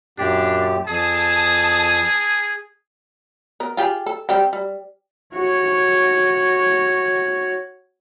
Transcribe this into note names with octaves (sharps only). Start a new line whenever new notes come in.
F#2 A#2 D4 G4
F2 G#4 A5 D#6
B3 A#4
F4 G4 G#4
A4
G3 C4 G4
G3
F#4 C#5